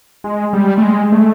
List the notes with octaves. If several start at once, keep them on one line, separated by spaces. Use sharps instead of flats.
G#3
G3
A3
G#3
A3